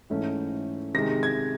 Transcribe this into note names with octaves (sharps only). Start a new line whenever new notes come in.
G#2 E3 A3 C#4
C3 D#3 G#3 A#6
G#6